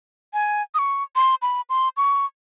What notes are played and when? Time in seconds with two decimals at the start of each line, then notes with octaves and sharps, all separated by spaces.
0.33 G#5
0.74 D#6
0.79 C#6
1.16 C6
1.42 B5
1.70 C6
1.97 C#6